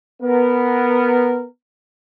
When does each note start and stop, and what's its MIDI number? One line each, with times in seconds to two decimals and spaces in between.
0.23 1.46 59
0.23 1.46 70